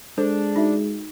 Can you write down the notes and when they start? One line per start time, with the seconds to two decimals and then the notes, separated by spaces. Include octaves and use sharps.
0.18 G#3 D4 A4 C5
0.56 D#4 F#4 E5